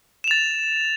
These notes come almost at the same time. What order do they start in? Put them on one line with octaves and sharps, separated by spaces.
E7 F7 A6